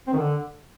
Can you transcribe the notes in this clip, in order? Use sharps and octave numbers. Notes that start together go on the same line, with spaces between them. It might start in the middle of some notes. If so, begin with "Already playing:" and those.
C4
D#3
D3